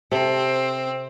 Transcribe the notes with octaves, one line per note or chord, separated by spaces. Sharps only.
C3 C4 A4